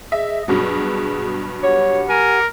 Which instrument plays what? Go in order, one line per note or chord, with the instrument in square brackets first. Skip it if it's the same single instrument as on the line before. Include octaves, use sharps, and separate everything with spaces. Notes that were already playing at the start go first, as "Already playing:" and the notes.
[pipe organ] G#4 D#5 [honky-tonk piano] E5
[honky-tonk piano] G2 B2 F#3 [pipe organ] G#4
[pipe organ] G4 F#5 [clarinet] C#5
[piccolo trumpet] A#4 [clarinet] G#5